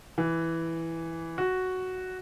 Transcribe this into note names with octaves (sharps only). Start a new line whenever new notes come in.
E3
F#4